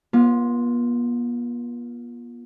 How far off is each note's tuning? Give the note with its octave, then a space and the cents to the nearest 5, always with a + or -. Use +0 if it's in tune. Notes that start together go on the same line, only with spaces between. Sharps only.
B3 -45 F4 +0